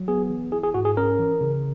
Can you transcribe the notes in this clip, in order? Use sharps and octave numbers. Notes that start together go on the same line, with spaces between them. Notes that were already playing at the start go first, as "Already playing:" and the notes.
Already playing: F#3
B3 G#4
E3
E4 G#4
G#4
G#2 F#4
G#4
C#4 A#4
E3
C#3